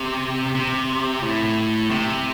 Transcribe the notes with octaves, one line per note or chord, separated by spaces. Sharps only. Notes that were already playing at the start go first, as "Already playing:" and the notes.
Already playing: C3
C3
A2
C3